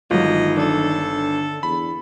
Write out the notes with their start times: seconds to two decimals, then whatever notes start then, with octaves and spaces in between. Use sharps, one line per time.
0.11 G1 D#3 F#3 G#3 F4 D#5
0.58 D4 A4
1.14 D3
1.63 E2 B5